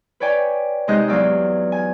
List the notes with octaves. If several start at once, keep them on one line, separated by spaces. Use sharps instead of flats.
B4 C#5 D5 G5 G#5
C3 G#3 D#4 D#5 F#6 G6
E2 F#3 D5 F5 E6
G#5